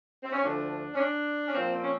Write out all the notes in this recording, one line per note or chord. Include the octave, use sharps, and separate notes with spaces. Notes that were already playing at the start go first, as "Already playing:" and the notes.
C4
C#4
D2 D3 F3 D4
C#4
D4
C#4
A#2 F3 A#3 C4
C4
C#4